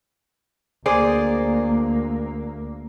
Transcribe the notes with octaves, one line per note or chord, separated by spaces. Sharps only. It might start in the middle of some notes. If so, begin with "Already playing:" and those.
D2 A#3 G#4 C5 D5